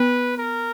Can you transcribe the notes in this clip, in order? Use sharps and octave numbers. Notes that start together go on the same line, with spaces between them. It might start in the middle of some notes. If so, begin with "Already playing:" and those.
Already playing: B3 B4
A#4